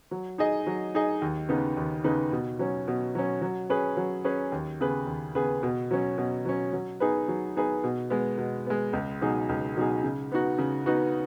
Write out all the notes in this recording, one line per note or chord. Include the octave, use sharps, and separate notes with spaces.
F#3
D#4 G#4 D#5
F#3
D#4 G#4 D#5
D#2
C#3 B3 D#4 B4
D#2
C#3 B3 D#4 B4
B2
F#3 C#4
B2
F#3 C#4
F#3
C#4 G#4 B4
F#3
C#4 G#4 B4
D#2
C#3 B3 G#4 B4
D#2
C#3 B3 G#4 B4
B2
F#3 C#4
B2
F#3 C#4
F#3
B3 D#4 G#4 B4
F#3
B3 D#4 G#4 B4
B2
G#3 B3
B2
G#3 B3
C#2
B2 F#3 D#4 G#4
C#2
B2 F#3 D#4 G#4
C#3
B3 D#4 F#4
C#3
B3 D#4 F#4